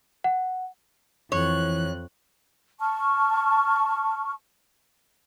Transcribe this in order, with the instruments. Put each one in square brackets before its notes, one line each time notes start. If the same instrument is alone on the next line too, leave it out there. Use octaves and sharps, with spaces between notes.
[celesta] F#5
[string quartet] F2 F#6 [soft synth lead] E3 [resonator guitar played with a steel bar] C#5
[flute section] A5 C#6 F6